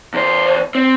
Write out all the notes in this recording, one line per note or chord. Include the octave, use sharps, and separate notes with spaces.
E2 C5
C4